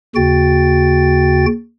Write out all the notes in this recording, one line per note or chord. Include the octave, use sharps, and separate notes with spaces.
D#2 C#3 F#4 G5 A6